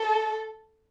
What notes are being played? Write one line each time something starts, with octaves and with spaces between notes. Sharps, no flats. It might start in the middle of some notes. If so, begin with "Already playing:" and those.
Already playing: A4